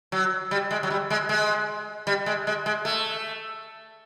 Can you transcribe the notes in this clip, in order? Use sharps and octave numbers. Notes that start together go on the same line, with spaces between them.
F#3
G3
G#3
F#3
G3
G#3
G#3
G3
G#3
G#3
G#3
A3